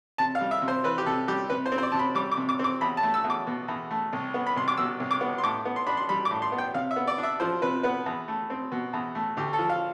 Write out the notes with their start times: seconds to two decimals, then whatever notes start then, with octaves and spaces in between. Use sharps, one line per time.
0.18 C3 A5
0.35 F5
0.41 G3
0.51 E5
0.62 C3
0.68 C5
0.84 E3 B4
0.98 G4
1.06 C3 A4
1.28 G3 G4
1.50 C3 B4
1.66 C5
1.72 C4
1.78 C5
1.83 D5
1.92 C3 A5
1.99 B5
2.15 G3 D6
2.31 D6
2.37 C3
2.49 D6
2.59 C4 D6
2.81 E2 B5
2.97 A5
3.03 A3
3.14 E6
3.24 E2
3.30 D6
3.47 B2
3.68 E2
3.91 A3
4.13 C2
4.34 B3
4.47 B5
4.56 C2 C6
4.68 D6
4.78 B2 E6
5.00 C2
5.11 D6
5.21 B3
5.38 C6
5.43 A2 D6
5.65 B3
5.76 C6
5.87 D4 B5
5.97 C6
6.09 G3 B5
6.25 D6
6.31 A2
6.42 C6
6.52 B3
6.58 G5
6.74 C3 F5
6.91 E5
6.96 B3
7.07 D5
7.18 D4
7.23 E5
7.40 F3 C5
7.62 C3 B4
7.83 B3 B4
8.06 E2
8.28 A3
8.50 C4
8.72 B2
8.93 E2
9.15 A3
9.37 D2 G4
9.53 A4
9.59 F3
9.69 F5